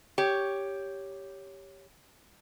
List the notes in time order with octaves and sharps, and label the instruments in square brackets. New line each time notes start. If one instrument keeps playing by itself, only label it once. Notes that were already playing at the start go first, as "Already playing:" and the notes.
[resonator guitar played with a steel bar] G4 C#5